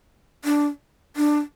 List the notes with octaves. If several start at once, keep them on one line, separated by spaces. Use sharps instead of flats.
D4
D4